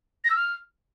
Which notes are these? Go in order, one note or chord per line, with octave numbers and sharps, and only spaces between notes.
A#6
E6
F6